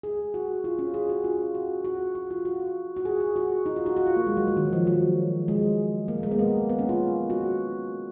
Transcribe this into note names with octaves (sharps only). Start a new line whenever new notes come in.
G#4
F#4
F4
C#4
G#4
F#4
F4
F#4
F#4
F#4
F4
F#4
F#4
G#4
G#4
F#4
D#4
F4
F#4
F#4
F4
A#3
G#3
F#3
F#3
D#3
F3
F#3
G#3
A#3
G#3
B3
A#3
B3
C#4
F4
F#4